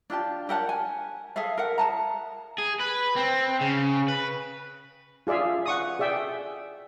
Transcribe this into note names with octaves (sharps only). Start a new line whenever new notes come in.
D4 F4 G4 A5
G4 A#4 F#5 A5
G#5
G#4 A4 E5 F5
A#4 E5 F#5
G#4 B4 A5 A#5
G#4
B4
C4
C#3
B4
F4 G#4 D5 E5 F5
F#5 C#6 D#6
G#4 D5 E5 G5